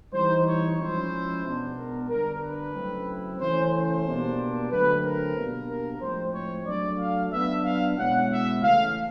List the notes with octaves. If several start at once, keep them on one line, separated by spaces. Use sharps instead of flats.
E3 G3 C4 D#4 C5
C#5
F3 G#3 C#4 E4 C5
B2 G#3 B3 D4
A#4
D3 G3 B3 D4 A#4
B4
C#3 F#3 A3 C4 E4
C#3 E3 A3 C#4 E4 C5
C5
B2 G3 A#3 D4
D3 F#3 A3 C4 B4
A#4
B2 G3 A#3 D4
A#4
A2 F3 G#3 C4 C5
C#5
F#3 A3 D4 D5
F5
F#3 B3 D4 E5
F5
B2 G#3 C#4 E4 F#5
E5
C#3 E3 A3 F5